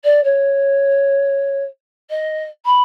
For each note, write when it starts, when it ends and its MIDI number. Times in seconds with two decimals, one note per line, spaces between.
0.04 0.23 74
0.24 1.64 73
2.10 2.44 75
2.65 2.83 83